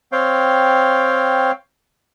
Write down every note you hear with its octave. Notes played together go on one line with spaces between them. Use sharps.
C4 C#5 F5 G5